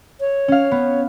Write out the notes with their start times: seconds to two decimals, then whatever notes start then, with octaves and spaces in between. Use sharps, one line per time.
0.20 C#5
0.48 C#4 F5
0.71 B3